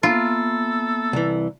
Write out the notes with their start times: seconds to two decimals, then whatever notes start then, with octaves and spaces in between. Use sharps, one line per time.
0.03 A#3 B3 F4 A4 E5
1.13 C2 E3